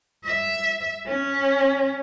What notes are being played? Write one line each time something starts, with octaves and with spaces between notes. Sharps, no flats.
E5
C#4